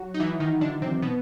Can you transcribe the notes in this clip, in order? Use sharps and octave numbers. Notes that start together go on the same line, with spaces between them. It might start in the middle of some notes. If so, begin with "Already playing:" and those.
Already playing: F#3 F#4
D#4
E3 E4
D#3 D#4
D3 D4
C3 C4
B2 B3